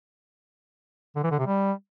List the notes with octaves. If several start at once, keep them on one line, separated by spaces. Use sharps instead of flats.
D3
E3
D3
C3
G3